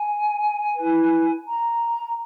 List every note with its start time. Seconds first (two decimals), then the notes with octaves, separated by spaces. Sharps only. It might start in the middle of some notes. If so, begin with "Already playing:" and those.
Already playing: G#5
0.75 E4 B4
1.47 A#5